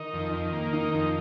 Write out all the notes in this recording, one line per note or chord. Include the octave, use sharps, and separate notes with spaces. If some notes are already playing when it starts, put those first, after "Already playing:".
Already playing: D#3 D#4
F2
D#3
A#3
D#3 D#4
F2